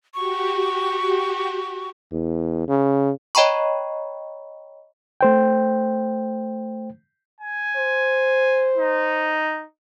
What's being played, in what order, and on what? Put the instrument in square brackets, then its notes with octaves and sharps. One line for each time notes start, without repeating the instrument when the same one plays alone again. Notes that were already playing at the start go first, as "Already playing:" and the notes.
[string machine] F#4 G4 [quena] C#6
[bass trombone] E2
C#3
[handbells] C#5 D#5 G5 A#5 B5 C#6
[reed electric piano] A3 C5 G5
[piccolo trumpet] G#5
[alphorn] C5
[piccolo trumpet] D#4